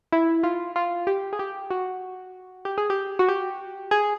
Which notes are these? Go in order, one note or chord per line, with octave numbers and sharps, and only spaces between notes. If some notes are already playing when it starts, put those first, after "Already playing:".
E4
F4
F4
G4
G#4
G4
F#4
G4
G#4
G4
F#4
G4
G#4